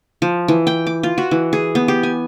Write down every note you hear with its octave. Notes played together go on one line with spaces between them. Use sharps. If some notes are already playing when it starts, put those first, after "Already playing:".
F3
E3
G5
D6
F4
F#4
E3
G#4
B3
G4
G#5